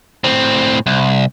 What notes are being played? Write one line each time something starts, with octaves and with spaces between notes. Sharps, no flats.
A2 C4
C2